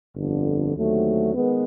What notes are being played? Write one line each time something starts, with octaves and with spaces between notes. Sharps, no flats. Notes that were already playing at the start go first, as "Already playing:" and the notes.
G1 F2 D3
D#2 D3 F#3 A3 C4
D#3 G#3 B3